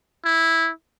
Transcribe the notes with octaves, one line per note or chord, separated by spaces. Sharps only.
E4